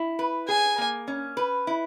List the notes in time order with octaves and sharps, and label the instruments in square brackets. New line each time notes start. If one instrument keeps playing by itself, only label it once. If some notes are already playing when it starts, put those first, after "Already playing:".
Already playing: [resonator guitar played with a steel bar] E4
B4
[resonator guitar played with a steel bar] G#4 [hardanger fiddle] G#5
[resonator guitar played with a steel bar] A#3
C#4
B4
E4